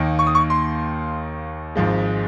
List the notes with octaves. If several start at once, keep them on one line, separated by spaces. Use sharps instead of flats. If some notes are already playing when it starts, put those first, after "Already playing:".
Already playing: D#2 D#3 A#3
C#6
D#6
C#6
C6
G#1 G#2 F3 G#3